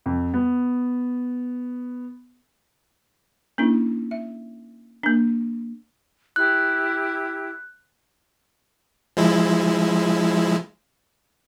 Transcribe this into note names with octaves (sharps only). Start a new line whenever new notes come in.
F2
B3
A#3 C#4 D4 E4
E5
A#3 D4
E4 G4 F#6
F3 G#3 E4